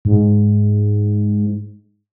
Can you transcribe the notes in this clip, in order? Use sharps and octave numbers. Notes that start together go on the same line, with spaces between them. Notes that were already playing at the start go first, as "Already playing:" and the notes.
G#2